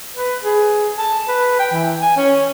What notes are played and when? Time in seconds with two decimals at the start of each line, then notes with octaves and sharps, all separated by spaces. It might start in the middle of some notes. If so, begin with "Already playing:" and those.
0.17 B4
0.44 G#4
0.98 A5
1.28 B4
1.59 G5
1.72 E3
2.01 G#5
2.17 C#4